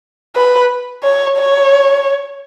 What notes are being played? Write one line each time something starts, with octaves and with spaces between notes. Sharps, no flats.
B4
C#5
C#5